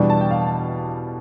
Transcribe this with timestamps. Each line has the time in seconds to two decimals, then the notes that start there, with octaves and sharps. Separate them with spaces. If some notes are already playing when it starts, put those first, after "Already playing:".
Already playing: E2 B2 G3 D4
0.10 A5
0.20 G5
0.31 F5